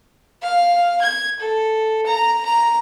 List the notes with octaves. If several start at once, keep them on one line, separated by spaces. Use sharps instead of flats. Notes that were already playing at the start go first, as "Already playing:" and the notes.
F5
G#6
A4
A#5
A#5